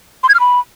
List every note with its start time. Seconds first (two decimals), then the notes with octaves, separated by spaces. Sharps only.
0.23 C6
0.29 G#6
0.34 F6
0.40 B5